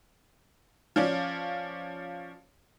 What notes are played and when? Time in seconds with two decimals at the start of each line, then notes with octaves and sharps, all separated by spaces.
0.96 F3 C#4 D5